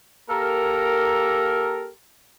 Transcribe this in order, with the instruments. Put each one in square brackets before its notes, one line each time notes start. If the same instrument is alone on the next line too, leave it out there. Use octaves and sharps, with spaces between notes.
[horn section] A#3 G4 A4 A#4